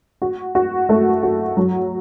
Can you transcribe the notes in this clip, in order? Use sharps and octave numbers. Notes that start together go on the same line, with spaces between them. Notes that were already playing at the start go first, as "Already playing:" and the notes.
F#4
F#4
A3
F#4
F#3